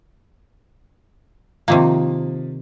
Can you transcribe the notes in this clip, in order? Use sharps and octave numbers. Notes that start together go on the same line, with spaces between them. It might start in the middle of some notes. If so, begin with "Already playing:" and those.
C3 D#3 F3 A#3